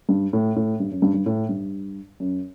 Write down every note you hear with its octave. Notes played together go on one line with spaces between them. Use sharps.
G2
A2
A2
G2
F#2
G2
G2
A2
G2
F#2